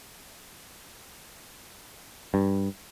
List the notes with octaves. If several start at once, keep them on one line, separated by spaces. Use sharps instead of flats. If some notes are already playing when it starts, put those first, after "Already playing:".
G2